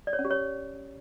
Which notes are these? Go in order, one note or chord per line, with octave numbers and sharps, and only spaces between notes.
D5
C#5
C#4
G4
C#5